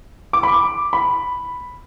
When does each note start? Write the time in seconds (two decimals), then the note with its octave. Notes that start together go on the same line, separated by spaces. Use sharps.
0.33 D6
0.43 B5
0.53 D6
0.93 B5